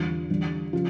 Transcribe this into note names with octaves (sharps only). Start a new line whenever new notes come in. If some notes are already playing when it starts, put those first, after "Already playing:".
Already playing: E2 D3 G3 F4
E2 D3 G3
C#3 F3 F4